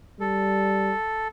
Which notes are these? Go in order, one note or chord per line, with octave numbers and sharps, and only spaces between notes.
G3 A4